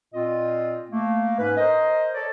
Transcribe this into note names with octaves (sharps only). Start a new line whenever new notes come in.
A#2 C4 F4 D#5
A3 A#3
G#2 C#4 B4
A#4 C5 D#5
A4 C#5 D5